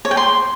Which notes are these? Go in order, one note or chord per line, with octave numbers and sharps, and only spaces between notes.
C#5
G5
C6